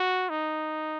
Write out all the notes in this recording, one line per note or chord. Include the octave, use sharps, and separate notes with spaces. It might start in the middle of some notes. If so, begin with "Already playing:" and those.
Already playing: F#4
D#4